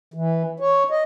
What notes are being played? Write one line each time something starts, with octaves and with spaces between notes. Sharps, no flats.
E3
C#5
D#5